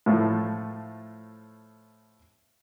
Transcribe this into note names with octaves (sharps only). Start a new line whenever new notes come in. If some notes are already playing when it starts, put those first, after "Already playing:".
A2 F3 A3